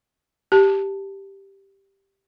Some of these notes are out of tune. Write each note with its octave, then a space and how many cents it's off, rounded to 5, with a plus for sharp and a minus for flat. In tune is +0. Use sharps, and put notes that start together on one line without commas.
G4 +0 A5 +0